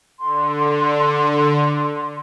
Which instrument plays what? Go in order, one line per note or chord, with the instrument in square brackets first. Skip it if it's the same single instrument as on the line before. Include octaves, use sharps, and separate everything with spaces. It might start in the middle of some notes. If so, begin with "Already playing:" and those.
[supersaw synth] D3 [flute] C6